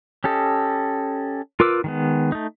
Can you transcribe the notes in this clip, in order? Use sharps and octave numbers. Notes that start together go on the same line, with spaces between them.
C#4 G4 A4 D#5
F4 A#4 B4 D6 E6
D#3 G#3 B3
A3 D#4